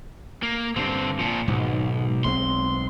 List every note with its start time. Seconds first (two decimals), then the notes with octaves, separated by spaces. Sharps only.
0.43 A#3
0.76 G2 D3 C4
1.19 A#2 F3
1.48 B1 G#2 D#3
2.24 B1 G#3 C4 C6